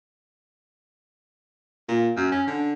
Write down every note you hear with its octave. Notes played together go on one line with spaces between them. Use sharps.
A#2
F#2
C#4
D3